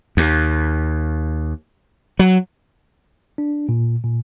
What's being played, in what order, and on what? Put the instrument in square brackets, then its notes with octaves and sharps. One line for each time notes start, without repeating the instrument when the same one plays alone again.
[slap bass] D#2
F#3
[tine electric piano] D4
A#2
A#2